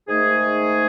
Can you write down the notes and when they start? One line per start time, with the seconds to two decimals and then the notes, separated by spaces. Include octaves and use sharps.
0.08 G#2 D#3 A3 D#4 G#4